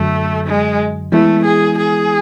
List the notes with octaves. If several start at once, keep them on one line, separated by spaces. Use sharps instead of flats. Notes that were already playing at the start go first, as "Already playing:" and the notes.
Already playing: F#2 D3 F#3 A3
G#3
E3 G#3 A3 B3 E4
G#4
G#4